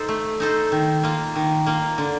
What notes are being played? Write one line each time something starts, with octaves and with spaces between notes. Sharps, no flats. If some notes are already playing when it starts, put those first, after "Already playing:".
Already playing: D#4 A4 C5
A3
D#4 A4 C5
D#3
A#3 F4
D#3
A#3 F4
D3